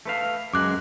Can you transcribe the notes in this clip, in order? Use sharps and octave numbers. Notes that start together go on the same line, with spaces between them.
A3 B4 F5
F#2 G#3 D6 F#6